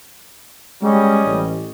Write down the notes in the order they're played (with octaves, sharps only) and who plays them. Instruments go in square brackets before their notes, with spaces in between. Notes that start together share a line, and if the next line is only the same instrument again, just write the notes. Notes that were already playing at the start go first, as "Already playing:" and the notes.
[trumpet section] G3 C#4 D#5 [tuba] G#3
[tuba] A1